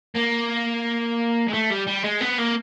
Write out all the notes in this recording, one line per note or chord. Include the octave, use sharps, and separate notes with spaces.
A#3
G#3
A3
G3
G3
G#3
B3
A#3